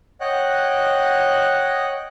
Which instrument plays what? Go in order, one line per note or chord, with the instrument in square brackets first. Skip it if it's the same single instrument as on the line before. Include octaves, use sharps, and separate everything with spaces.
[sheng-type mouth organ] C#5 D#5 F#5 G5 F#6